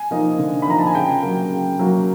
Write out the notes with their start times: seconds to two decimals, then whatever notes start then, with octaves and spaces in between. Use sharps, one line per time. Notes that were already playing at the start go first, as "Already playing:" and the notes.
Already playing: G#5
0.11 F3 A#3 D#4
0.39 D3
0.62 B5
0.67 F3 A#3 D#4 A#5
0.79 A5
0.87 G#5
0.95 C#3 G5
1.23 F#3 A#3
1.51 C#3
1.79 F#3 A#3